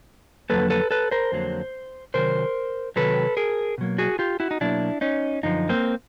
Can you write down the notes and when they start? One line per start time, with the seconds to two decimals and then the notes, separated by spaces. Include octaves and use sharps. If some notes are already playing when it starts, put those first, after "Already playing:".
0.49 F2 D3 F#3 A#3 A4 B4
0.70 A4 B4
0.91 A4 B4
1.11 A#4 C5
1.32 F2 D3 F#3 A#3
2.14 C3 D#3 F#3 A#4 C5
2.96 C3 D#3 F#3 A4 B4
3.37 G#4 A#4
3.78 B2 F#3 A#3
3.98 F#4 G#4
4.19 F4 G4
4.40 E4 F#4
4.51 D#4
4.61 B2 F#3 A#3 D4 E4
5.01 C#4 D#4
5.43 F#2 D3 F3 D#4
5.69 A#3 C4